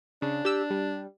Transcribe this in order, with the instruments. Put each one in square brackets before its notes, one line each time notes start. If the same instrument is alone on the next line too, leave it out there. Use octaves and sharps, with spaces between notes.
[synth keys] C#3 [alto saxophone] D4
[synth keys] G4 E6
G3